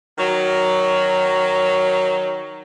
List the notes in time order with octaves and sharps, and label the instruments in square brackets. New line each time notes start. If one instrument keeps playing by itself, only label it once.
[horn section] D#3 F#3